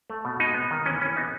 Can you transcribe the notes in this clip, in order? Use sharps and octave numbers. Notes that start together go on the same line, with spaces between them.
A3
B2
G#3 D#4
B3
D#3
E3 C#4
E3 C#4
B3 D#4